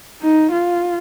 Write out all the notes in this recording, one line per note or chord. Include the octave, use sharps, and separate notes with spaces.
D#4
F4